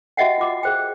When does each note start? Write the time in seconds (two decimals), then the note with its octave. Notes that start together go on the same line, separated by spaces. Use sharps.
0.17 F#4 G4 D#5 E5 F#5 G5
0.38 F4 D6
0.63 G#4 C5 G5